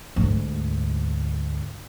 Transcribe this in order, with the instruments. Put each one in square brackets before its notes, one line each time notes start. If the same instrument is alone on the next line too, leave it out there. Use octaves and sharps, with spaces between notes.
[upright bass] D2 G#2